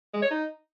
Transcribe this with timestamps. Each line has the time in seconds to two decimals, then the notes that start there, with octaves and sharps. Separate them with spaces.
0.13 G#3
0.22 C#5
0.31 D#4